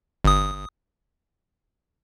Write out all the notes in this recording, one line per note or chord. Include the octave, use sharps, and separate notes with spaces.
G1 D#6